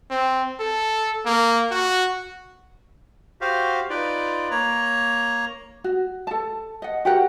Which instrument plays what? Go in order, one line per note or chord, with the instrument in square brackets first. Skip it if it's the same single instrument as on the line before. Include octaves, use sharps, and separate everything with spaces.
[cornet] C4
A4
A#3
F#4
[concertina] F#4 G4 C5 F5
D#4 F4 B4 D5
A#3 C#5 A#5
[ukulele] F#4
A4 A5
D#5 F#5
F#4 G4 A#4 F#5